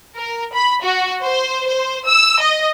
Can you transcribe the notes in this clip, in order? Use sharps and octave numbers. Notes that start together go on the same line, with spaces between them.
A#4
B5
F#4
C5
C5
E6
D#5